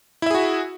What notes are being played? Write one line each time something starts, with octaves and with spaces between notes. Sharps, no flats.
E4 F#4 G#4 E5